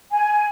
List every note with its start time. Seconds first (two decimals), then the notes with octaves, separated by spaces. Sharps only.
0.11 G#5